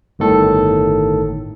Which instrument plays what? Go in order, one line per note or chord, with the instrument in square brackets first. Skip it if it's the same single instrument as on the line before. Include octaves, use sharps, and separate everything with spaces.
[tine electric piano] G1 A2 D#3 A4